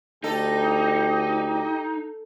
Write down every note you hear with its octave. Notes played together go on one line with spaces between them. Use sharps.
D2 D#4 G4 A4